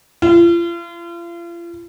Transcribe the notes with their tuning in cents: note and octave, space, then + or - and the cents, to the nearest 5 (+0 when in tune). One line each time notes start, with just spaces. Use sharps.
F4 -40